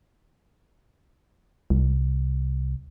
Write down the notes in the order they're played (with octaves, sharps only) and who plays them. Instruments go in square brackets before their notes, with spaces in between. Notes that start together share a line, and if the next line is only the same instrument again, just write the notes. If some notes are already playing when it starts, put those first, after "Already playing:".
[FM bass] C2